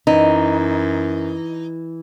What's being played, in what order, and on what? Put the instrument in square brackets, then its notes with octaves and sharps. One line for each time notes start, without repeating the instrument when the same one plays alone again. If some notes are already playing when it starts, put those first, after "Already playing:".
[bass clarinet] F#2 [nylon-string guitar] E3 [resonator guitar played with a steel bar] D#4